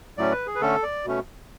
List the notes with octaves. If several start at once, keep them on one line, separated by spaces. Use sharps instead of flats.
A2 F#3 A3 C#4 D5
B4
G#4
B4
D3 A3 C#4 A4
D5
B2 A3 C#4